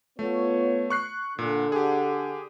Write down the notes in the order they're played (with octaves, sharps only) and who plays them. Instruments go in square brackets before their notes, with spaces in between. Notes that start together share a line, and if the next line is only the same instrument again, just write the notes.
[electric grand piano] A3 [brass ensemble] B3 F4 C#5
[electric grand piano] C#6 F#6 C7
[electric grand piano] A#2 [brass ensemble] D3
[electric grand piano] G4 G#4